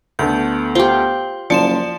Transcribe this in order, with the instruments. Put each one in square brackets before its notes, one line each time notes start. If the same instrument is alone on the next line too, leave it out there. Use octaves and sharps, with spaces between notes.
[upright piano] D2 A3 B3 [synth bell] G6
[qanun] F4 G4 [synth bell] C5
[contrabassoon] F#1 [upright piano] F3 C#7 [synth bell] D5 C6 E7